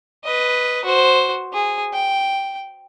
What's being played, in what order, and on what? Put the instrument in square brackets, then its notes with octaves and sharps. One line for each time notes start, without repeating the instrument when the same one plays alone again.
[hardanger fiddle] B4 D#5
F#4 C5
G#4
G5